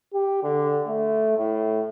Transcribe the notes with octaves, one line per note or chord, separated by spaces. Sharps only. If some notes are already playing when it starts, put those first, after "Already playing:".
G4
D3
A3
A2